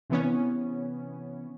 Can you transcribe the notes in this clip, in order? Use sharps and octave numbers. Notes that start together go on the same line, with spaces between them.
C3 E3 B3 C#4